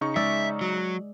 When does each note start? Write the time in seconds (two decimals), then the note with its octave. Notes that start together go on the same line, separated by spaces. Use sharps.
0.01 C#3 D#4 C#6
0.16 G#3 D5 E5 E6
0.61 F#3